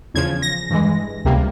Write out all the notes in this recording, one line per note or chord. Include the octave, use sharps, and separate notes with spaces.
E2 C#3 F3 G#6
A#6
G2 E3 G#3
C#2 C3 G3 A#3